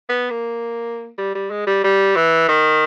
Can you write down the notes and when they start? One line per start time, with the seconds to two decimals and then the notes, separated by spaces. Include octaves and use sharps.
0.09 B3
0.30 A#3
1.18 G3
1.35 G3
1.50 G#3
1.67 G3
1.84 G3
2.16 E3
2.48 D#3